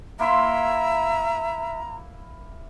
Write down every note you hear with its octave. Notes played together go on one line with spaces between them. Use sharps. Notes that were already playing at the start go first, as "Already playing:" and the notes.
A#3 E4 E5 A#5 C6